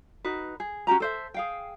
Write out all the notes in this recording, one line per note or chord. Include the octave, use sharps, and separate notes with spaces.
D#4 F#4 B4
G#4
C#4 F#4 G4 A#5
A4 C5 E5
G#4 F5 G5